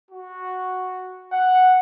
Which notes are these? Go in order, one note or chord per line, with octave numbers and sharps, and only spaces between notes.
F#4
F#5